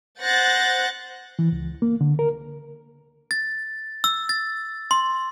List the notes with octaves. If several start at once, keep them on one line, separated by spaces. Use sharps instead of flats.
C5 F#5 F#6 G6 A6 A#6
E3
C#2
A#3
D3
A#4
A6
E6
A6
C6